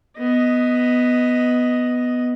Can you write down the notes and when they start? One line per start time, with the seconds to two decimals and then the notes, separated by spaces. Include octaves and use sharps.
0.18 B3 D#5